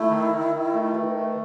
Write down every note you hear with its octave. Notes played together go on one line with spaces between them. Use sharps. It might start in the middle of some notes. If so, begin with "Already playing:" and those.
Already playing: A3 E4
D#3
D#3
D#3
A3
D#3 B4
A3